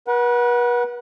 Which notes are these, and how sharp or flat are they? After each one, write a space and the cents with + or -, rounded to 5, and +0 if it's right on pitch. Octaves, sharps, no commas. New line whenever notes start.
B4 -40 F#5 +0